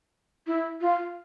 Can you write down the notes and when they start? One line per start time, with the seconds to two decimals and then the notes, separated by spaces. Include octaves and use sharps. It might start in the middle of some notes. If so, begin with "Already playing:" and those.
0.47 E4
0.81 F4